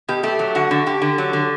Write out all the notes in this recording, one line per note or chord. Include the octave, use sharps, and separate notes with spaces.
B2 G4
A3 G4
F#3
D3 F#4
D3
D3 G4
D3
F#3
D3